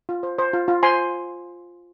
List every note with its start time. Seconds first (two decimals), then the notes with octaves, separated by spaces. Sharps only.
0.09 F4
0.23 C5
0.39 C5
0.53 F4
0.68 F4
0.83 C5 G#5 C6